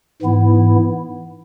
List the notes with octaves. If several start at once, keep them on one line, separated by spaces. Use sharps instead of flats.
G#2 E3 B3 E4